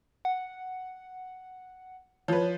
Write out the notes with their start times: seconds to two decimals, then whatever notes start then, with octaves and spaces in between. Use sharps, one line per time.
0.25 F#5
2.28 F3 B4 C#5